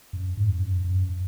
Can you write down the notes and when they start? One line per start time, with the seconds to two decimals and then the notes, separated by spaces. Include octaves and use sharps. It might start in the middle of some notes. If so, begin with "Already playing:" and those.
0.13 F#2
0.37 G#2
0.50 F2
0.61 F#2
0.84 F#2